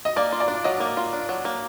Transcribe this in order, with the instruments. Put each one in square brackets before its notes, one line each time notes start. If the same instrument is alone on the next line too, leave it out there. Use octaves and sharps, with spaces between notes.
[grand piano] D#5
[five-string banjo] A#3 [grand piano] D5
[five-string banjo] F4
[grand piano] D5
[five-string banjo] D4
[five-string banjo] F#3 [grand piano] D#5
[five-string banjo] A#3
F4
D4
F#3
A#3